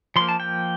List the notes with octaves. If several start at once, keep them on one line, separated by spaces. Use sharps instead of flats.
F3 A#3 C6
A5
G5